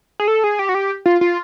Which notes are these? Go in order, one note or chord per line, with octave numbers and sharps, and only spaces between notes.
G#4
A4
G#4
G4
F#4
G4
F4
F4